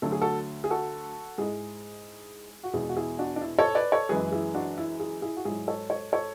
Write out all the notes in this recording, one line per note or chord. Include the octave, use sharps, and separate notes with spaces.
D2 D3 F#3 A4
G#4
F#4 A4
G#4
F#4 A4
G#2 G#3 E4 G#4
F#4
E2 B2 G#3 E4 G#4
F#4
E4 G#4
D4 F#4
D4
E4
A4 C#5
B4 D5
A4 C#5
F#2 E3 G#3 G#4 B4
E4 G#4
D4 F#4
E4
E4 G#4
E4 G#4
F#4
G#2 F#3 E4 G#4
A4 C#5
A4 C#5
A4 C#5